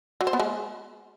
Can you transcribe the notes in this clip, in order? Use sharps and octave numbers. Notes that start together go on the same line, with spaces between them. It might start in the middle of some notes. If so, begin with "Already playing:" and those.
F#3
C5
B3
G#3